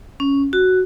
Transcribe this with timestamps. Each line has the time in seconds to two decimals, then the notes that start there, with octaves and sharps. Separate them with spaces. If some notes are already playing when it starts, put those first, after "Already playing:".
0.20 C#4
0.53 F#4